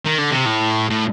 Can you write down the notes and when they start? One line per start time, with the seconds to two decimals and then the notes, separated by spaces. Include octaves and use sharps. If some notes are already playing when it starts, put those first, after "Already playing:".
0.05 D#3
0.18 D3
0.31 C3
0.45 A2
0.90 A2